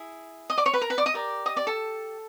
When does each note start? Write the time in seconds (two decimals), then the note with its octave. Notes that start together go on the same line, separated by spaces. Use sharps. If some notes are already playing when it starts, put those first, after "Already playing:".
Already playing: E4 G#4
0.50 D#5 D#6
0.58 D5 D6
0.65 C#5 C#6
0.74 B4 B5
0.81 A#4 A#5
0.90 B4 B5
0.98 D5 D6
1.06 D#5 D#6
1.14 G4 A#4 D5
1.46 D#5 D#6
1.56 D5 D6
1.67 A4 A5